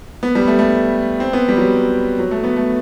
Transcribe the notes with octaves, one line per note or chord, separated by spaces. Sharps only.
B3
G3
A3
A3
C4
B3
G3
F#3
F#3
A3
B3
A3